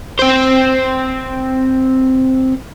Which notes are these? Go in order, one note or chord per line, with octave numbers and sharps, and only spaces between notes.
C4 C5